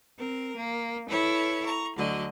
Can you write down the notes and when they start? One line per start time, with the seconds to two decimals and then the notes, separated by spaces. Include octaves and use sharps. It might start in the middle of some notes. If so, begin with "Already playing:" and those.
0.18 C4 A#4
0.56 A#3
1.08 E4 A4 B4 C#5
1.65 A#5 C#6
1.97 D2 D3 F#3 D#5